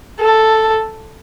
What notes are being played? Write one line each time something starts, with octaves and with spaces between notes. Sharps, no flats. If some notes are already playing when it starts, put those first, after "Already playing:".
A4